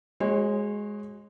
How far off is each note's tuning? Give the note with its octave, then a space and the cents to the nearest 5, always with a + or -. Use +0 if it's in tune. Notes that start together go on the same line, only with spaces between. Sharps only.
G#3 +0 F#4 +5 C#5 -35